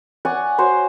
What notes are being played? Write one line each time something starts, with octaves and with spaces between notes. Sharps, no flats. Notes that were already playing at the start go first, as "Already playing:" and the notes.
D5 F#5 G#5 C#6
F#4 C5 C#5 C6